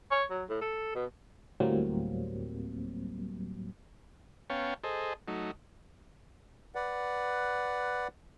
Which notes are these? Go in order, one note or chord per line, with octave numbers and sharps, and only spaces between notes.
C#5
F#3
A2
A4
B2
D2 A2 F#3 G3 A#3 C4
B3 C#4 C#5 F5 G5 A5
G#4 A4 C5 D#5
F#3 A3 D#4
B4 D5 F#5